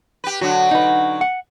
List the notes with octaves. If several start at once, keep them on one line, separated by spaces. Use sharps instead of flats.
G4 B4
D3 F#3 F#4
D#4 B4
F#5